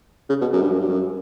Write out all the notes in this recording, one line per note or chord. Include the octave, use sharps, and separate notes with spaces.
C#3
B2
F#2
G2
F#2
G2
F#2